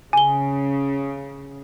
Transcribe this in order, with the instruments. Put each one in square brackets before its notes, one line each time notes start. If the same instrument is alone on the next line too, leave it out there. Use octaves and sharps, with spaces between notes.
[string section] C#3 [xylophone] G#5 G7